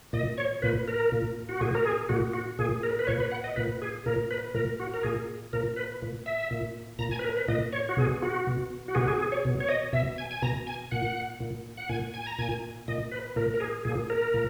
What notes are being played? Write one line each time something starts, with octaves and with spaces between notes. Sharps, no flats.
A#2 D#5
C#5
A#2 B4
A#4
A#2
F#4
A#2 G#4
A#4
G#4
A#2 F#4
F#4
A#2 G#4
A#4
B4
A#2 C#5
B4
F#5
D#5
A#2 B4
G#4
A#2 A#4
B4
A#2 A#4
F#4
A#4
A#2 G#4
A#2 A#4
B4
A#2
E5
A#2
A#2 A#5
G#5
B4
A#4
B4
A#2 D#5
C#5
F#4
B2 G#4
F#4
B2
F#4
B2 G#4
F#4
G#4
G#4
C#5
B2
C#5
D#5
B2 E5
G#5
G#5
B2 A#5
G#5
A#2 F#5
A#2
F#5
A#2 G#5
G#5
A#5
A#2 G#5
A#2 D#5
B4
A#2 A#4
A#4
G#4
A#2 G#4
A#4
A#2